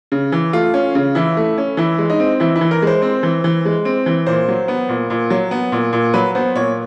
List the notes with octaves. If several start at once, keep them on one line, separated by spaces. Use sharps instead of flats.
C#3
E3
A3 F4
C#4
C#3
E3 E4
A3
C#4
E3 E4
G#3
D#4
C4
E3 E4
E4
E3
A#4
G#3 C5
C4
E3
E3
G#3
C4
E3
A#2 C5
F#3
B3
A#2
A#2
F#3
B3
A#2
A#2
F#3 B4
B3 C5
A#2 C#5